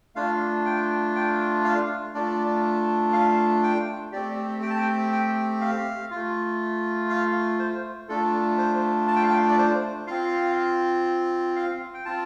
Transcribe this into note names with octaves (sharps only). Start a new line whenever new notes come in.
A3 D4 F4 F5
G5
G5
F5
A3 D4 F4 D5
F5
G5
A3 C4 G4 D5
G5
A5
G5
G5
F5
A3 F4
F5
C5
A3 D4 F4 A4
C5
A5
G5
F5
G5
D5
C5
C4 F4 F5
F5
G5
C4 F4 A5